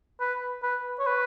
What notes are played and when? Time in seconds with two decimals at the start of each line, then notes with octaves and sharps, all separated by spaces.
0.20 B4
0.63 B4
0.99 C#5
1.06 B4